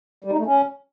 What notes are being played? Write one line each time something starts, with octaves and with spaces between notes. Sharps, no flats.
G3
D#4
A3
C#4